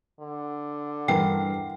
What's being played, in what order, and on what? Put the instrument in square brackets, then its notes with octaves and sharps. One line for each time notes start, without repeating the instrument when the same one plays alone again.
[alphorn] D3
[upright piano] G2 A#4 C7 [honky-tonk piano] E3 [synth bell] G5